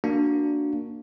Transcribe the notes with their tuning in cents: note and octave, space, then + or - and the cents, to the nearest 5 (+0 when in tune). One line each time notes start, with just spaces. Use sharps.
A#3 -5 D4 +0 F#4 +0